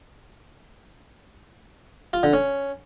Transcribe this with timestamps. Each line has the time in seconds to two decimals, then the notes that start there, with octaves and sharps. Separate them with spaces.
2.13 F4
2.23 D3
2.33 C#4